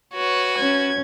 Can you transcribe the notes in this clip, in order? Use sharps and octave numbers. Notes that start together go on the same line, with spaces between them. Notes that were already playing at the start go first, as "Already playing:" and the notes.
F#4 B4 C#5
C#4 G#6